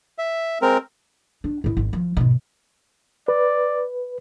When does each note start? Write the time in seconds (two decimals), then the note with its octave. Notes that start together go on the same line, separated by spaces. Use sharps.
0.18 E5
0.62 G#3 C4 A#4
1.44 D4
1.64 A2 E4
1.77 G#1
1.93 F3
2.17 G#1 B2
3.28 B4 D5